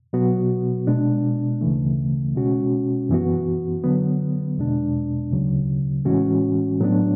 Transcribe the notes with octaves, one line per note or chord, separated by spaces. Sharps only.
B2 F#3 B3 F#4
B2 G#3 D4
D2 C#3 E3 A3
B2 G#3 C#4 F#4
F#2 E3 B3 F#4
D3 F#3 B3
E2 B2 G#3 D4
D2 C#3 F#3
A2 E3 G#3 C#4 F#4
A2 F#3 B3 D4